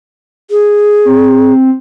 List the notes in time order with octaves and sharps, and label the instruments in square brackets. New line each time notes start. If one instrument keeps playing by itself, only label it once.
[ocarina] G#4
[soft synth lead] C4